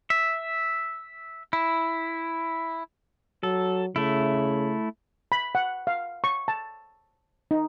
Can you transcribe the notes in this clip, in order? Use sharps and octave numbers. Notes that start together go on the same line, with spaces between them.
E5
E4
F#3 A4
C#3 A3 E4
B5
F#5
F5
C#6
A5
D#4